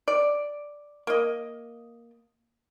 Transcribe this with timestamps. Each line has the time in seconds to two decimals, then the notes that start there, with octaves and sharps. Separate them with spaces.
0.08 D5
1.07 A#3 D#5